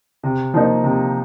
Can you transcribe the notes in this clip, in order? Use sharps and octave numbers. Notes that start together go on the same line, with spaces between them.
C3
F3 A#3 D#4
C3